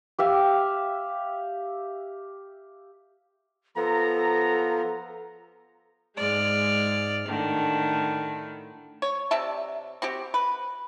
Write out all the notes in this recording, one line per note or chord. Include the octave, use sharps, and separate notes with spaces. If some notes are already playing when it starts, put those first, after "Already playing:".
G4 E5 F5
F3 B3 A4 A#5
G#2 G#3 D5 F6
A2 D3 D#3
C#5
C3 D5 E5 A5
C4 F#4 G4
B4